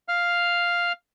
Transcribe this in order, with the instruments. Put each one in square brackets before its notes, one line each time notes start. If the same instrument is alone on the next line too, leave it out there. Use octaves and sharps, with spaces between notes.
[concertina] F5 F6